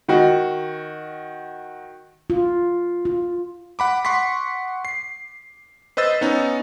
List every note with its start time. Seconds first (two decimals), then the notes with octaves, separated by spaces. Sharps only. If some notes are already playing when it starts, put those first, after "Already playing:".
0.09 D#3 F#4
2.30 F4
3.05 F4
3.79 F#5 B5 D6
4.05 F#5 C6 C#6 B6
4.85 C7
5.97 B4 C5 D#5 E6 A6
6.21 B3 C#4 D#4